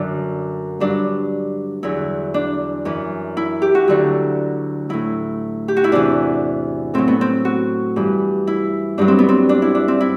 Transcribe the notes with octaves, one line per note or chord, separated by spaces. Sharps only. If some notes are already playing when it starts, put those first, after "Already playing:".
Already playing: F#2 D3 F#3 D4
G2 F#3 D4
E2 D3 F#3 E4
D4
F#2 E3
E4
G4
F#4
D2 D3 F#3
A2 F#3 E4
G4
F#4
E4
E2 C3 E3 D4
A2 F#3 C4
B3
C4
F#4
G2 E3
E4
G2 F#3 D4
C4
B3
C4
D4
E4
D4
C4
E4